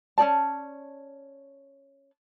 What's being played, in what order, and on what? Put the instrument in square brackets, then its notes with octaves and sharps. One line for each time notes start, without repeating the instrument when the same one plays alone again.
[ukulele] C#4 D#4 D5 A5